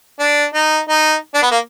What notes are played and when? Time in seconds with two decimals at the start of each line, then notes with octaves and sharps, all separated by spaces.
0.20 D4
0.54 D#4
0.89 D#4
1.34 D4
1.42 B3
1.51 A#3